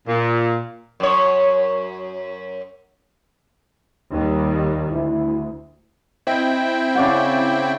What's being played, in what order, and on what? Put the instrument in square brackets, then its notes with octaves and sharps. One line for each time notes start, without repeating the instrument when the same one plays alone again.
[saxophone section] A#2
[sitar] F#2 C#5
[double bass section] D#2 D#3 G3
[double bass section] D2 [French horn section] E4
[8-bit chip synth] C4 E4 G5 [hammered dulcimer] D#5
[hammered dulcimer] C#3 D5 F#5